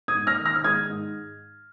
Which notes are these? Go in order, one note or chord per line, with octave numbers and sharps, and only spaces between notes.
D#6 G#6
G#2
F6 A#6
D#3
F6 A#6
F6
G#3 D#6 G#6
G#2